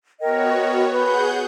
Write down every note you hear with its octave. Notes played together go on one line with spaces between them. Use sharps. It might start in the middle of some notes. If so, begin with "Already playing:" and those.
B3 F#4 A#4 C#5 D#5 G5
G#4 B4 F#5 G6